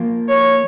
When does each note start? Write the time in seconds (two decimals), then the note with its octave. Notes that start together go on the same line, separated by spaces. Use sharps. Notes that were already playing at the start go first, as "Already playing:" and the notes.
Already playing: F3 A#3 F4
0.29 C#5